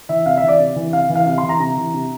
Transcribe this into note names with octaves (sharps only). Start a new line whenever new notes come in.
E3 E5
C3 F5
E5
E3
D5
C3
E3
C3 F5
E3
F5
C3 F5
C6
E3
A#5
C3 A#5
E3
C3